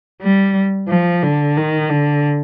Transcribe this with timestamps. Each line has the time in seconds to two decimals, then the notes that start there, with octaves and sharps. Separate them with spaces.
0.22 G3
0.89 F3
1.23 D3
1.57 D#3
1.90 D3